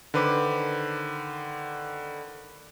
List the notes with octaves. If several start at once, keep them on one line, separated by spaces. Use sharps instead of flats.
D3 D#3 B4 C5 D6